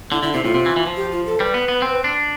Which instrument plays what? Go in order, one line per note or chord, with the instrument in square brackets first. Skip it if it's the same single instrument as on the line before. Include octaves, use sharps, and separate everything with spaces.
[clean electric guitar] D3 [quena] E4
[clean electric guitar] D3 [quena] E4
[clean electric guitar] C3 [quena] E4
[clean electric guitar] A2 [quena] F4
[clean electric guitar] C3
E3
E3
F3
[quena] G4
F4
A4
[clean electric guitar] G3 [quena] B4
[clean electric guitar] B3
B3
C4
D4